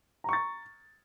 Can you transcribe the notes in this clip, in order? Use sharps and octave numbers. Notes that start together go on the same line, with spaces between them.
A#5 C#6 A6